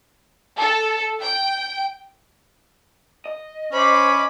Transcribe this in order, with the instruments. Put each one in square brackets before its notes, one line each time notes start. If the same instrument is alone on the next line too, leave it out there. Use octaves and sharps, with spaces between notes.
[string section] A4
G5
[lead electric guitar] D#5
[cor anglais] C#4 [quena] C5 [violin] B5 D6